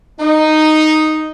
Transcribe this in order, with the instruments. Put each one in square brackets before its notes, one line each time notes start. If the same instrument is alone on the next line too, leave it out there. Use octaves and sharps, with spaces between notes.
[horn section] D#4